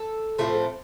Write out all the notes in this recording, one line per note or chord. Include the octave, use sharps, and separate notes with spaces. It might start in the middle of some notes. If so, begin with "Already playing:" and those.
Already playing: A4
A2 F3 A3 C4